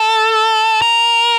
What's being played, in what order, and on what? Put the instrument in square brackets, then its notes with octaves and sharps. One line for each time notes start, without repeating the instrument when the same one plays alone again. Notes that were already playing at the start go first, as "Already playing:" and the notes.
Already playing: [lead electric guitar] A4
A#4